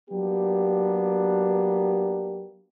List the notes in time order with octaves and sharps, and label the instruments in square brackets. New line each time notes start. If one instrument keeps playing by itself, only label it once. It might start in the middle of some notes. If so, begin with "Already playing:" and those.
[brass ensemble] F#3 A#3 B3 D4 G4